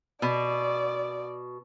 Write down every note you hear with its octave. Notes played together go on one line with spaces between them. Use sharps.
B2 D5